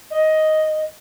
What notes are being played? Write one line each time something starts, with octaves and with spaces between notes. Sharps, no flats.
D#5